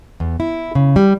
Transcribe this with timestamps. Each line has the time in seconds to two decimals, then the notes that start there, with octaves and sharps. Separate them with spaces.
0.20 E2
0.40 E4
0.75 C#3
0.96 G3